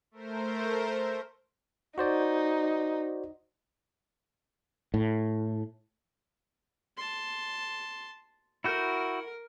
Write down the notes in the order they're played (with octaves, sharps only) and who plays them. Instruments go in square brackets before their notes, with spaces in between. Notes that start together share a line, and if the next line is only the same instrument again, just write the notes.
[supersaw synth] A3 A#4 C5
[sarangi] D#4 [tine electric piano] F#4 C5 D5
[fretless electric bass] A2
[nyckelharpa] A5 C6
[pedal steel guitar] E4 F#4 G6 [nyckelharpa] A#4